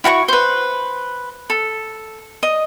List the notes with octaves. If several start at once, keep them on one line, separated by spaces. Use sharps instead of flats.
E4 F#4 G#5 C#6
B4 C5
A4
D#5